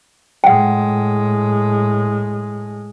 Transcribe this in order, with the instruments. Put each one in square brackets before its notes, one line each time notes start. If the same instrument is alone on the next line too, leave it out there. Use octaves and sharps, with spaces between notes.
[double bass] A2 G#3 [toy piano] F#5 G5